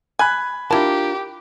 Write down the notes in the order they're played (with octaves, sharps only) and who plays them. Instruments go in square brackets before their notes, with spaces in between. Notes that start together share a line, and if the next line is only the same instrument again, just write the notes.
[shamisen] G#5 [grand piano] B5 F#6 G#6
[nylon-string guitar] D4 F4 A#4 [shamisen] E4 A5 [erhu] G4